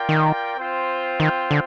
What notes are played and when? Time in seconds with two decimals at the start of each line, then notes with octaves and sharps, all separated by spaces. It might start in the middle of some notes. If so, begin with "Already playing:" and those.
Already playing: F4 A#4 D5 G5
0.09 D#3
0.56 C4 F4 C5 G5
1.20 D#3
1.51 D3